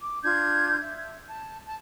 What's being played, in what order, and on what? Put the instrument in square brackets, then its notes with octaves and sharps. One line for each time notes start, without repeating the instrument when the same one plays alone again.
[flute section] D6
D4 F4 G6 G#6
E5
A5
A5